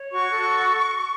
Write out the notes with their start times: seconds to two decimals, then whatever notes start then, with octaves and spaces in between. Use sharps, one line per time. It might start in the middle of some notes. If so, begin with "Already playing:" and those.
Already playing: C#5
0.10 F#4 C#6
0.30 A4
0.50 F#4